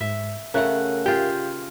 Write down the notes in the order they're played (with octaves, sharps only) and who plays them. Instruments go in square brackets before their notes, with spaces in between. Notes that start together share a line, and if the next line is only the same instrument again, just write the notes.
[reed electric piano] G#2 [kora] E5
[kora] C#3 A3 F#5 [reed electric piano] A#4 F#6
[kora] F4 G#4 [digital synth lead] G4